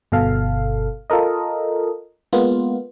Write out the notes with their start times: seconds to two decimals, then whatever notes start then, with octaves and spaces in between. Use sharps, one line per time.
0.12 G1 B2 A4 F5
1.10 F4 A4 A#4 D#5
2.33 G#3 A#3 B3 F4